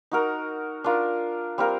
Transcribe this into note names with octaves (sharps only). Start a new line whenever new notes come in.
D#4 F#4 A#4
D4 F4 A#4
G3 C4 F4 A#4